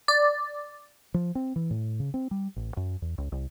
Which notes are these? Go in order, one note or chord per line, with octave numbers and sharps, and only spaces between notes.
D5
F3
C4
E3
A2
C#3
C4
G3
A1
F#2
E2
C#2
C2